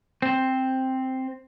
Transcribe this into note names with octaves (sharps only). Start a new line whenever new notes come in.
C4